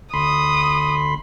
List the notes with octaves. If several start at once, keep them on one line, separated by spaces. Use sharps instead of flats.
D2 B5 C6 D#6